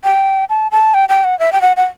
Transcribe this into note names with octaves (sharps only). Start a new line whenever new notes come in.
G5
A5
A5
G5
G5
F#5
E5
G5
F#5
F#5